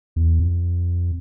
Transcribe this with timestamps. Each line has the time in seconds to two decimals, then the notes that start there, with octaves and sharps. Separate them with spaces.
0.16 E2
0.40 F2